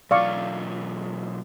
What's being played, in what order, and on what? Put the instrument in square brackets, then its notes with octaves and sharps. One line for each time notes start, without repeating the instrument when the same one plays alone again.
[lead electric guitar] B1 F4 [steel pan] D5 F5 C#6